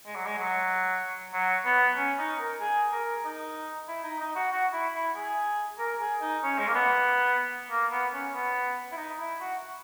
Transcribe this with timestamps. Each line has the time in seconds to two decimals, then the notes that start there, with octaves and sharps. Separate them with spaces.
0.06 G#3
0.16 F#3
0.26 G#3
0.38 F#3
1.33 F#3
1.65 B3
1.97 C#4
2.18 D#4
2.40 A#4
2.60 G#4
2.92 A#4
3.25 D#4
3.88 E4
4.04 D#4
4.20 D#4
4.35 F#4
4.52 F#4
4.73 E4
4.94 E4
5.16 G#4
5.79 A#4
6.01 G#4
6.21 D#4
6.43 C#4
6.59 G#3
6.67 A#3
6.75 B3
7.71 A#3
7.92 B3
8.13 C#4
8.34 B3
8.92 E4
8.97 D#4
9.19 E4
9.40 F#4